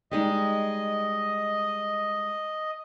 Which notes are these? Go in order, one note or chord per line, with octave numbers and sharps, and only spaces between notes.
G3 G#3 D#4 D#5